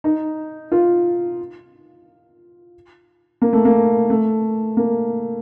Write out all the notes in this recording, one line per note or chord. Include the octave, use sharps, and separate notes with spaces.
D#4
F4
A#3
A3
A#3
A3
A#3